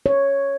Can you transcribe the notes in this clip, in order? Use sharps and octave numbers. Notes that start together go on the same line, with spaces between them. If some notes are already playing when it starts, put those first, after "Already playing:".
C#5